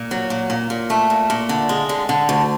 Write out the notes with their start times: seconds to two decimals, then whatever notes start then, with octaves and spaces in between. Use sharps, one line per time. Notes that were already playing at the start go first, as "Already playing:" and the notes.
Already playing: A#2
0.11 F#3
0.30 A#2
0.50 A#2
0.70 A#2
0.90 A3
1.10 A#2
1.30 A#2
1.49 D3
1.69 G#3
1.89 D3
2.09 D3
2.29 D2